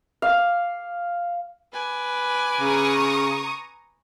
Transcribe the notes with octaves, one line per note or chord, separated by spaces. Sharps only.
F5
B4 G#5 D6
C#3 A#5 C#6 D#6